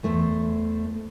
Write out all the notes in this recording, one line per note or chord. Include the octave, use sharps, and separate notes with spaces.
E2 A3 C5